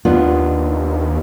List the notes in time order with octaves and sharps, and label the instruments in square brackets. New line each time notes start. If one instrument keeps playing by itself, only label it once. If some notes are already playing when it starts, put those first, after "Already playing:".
[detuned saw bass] D#2 [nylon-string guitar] B3 D4 F4